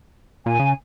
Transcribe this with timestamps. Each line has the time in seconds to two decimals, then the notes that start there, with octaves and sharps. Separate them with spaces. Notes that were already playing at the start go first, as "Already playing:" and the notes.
0.46 A#2 G#5
0.59 C#3